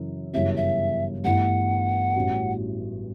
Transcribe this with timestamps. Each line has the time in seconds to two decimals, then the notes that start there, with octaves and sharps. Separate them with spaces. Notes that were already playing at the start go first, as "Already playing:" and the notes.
Already playing: F#2 C#3 E3
0.33 G1 F#2 C#3 E3 G3 E5
0.56 E5
1.24 G1 G2 E3 A3 E4 F#5
2.16 A1 A2 G3 C#4 F#4